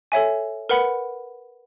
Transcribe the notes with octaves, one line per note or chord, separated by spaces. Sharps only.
A4 C#5 E5 G#5
A#4 B4 F#5 B5 C#7